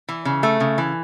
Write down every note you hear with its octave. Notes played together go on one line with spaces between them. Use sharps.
E3
C#3
A3
C#3
E3